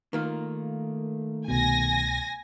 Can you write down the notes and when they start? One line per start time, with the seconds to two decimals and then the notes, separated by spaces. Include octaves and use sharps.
0.13 D#3 A3 A#3 F4
1.48 C2 B2 G#5 A#6